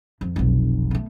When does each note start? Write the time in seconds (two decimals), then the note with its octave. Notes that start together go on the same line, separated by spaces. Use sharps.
0.21 F2
0.36 F1 B1
0.91 A3 B3